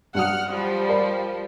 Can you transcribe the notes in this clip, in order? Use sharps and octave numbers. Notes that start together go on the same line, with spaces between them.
G2 F#3 F#5 D#6 F6
F3 G3
A#4 D5 B5